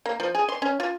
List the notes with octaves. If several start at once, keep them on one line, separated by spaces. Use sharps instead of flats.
A#3
F3
G#4
C6
C#4
F4